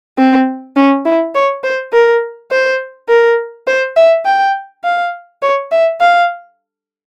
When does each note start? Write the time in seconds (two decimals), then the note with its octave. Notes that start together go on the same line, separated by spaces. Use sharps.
0.18 C4
0.76 C#4
1.05 E4
1.35 C#5
1.64 C5
1.93 A#4
2.51 C5
3.09 A#4
3.67 C5
3.96 E5
4.26 G5
4.84 F5
5.42 C#5
5.72 E5
6.01 F5